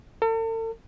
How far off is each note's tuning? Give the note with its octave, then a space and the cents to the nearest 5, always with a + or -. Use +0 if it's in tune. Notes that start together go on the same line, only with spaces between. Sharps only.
A4 +40